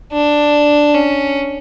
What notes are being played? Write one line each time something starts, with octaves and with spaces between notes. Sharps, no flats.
D4
C#4